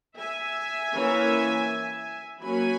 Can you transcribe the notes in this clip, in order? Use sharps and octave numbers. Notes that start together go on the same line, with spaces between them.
E5 G#5
E3 A#3 C#4
F#3 A#3 C#4 G#5 B5